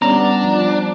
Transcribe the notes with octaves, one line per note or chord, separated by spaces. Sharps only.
G3 B3 C#4 D4 A#5
F3